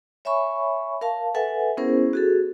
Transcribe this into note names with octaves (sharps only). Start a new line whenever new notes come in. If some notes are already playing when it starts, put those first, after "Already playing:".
C#5 E5 G#5 B5 C#6
A#4 F5 A5
A4 B4 E5 F#5 G#5
B3 C#4 E4 G#4 A#4 C5
F#4 G#4 A4